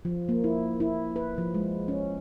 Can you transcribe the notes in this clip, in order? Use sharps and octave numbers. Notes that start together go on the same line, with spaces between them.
F3
A#3
E4
E4
B4
F3
G#3
C#4